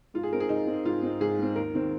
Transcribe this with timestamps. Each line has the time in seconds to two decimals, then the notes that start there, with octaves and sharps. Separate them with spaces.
0.14 G#2 F4
0.23 G#4
0.31 G#3 C4 A#4
0.40 G#4
0.49 G#2 D#4
0.67 G#3 C4
0.85 G#2 F4
1.03 G#3 C4
1.21 G#2 G#4
1.39 G#3 C4
1.56 D#2 A#4
1.74 D#3 C4